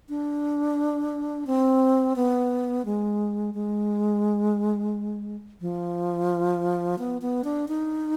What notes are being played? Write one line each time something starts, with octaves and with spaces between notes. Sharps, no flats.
D4
C4
B3
G#3
G#3
F3
B3
B3
D4
D#4